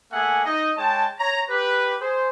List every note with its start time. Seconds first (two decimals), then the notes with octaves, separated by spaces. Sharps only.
0.12 A3 A#3 G#4 E5 F#5 G#5
0.45 D#4 D#5
0.78 G#3 C#5 G5 A5
1.19 C#5 A#5
1.50 G4 B4
2.01 G#4 C5